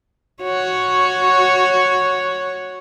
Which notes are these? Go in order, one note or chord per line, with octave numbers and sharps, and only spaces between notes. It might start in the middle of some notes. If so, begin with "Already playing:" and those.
F#4 C#5